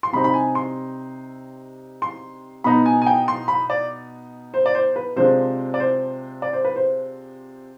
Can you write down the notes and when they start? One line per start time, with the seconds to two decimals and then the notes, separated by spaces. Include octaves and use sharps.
0.03 C6
0.12 C3 G3 C4 D#4 B5
0.24 B5
0.34 G#5
0.55 C6
2.02 C6
2.64 B2 B3 D#4 B5
2.86 G#5
3.02 G#5
3.07 G5
3.28 C6
3.48 B5
3.70 D5
4.54 C5
4.66 D5
4.75 C5
4.96 B4
5.16 C3 F3 G#3 D4 C5
5.74 D5
5.80 C5
6.42 D5
6.53 C5
6.65 B4
6.76 C5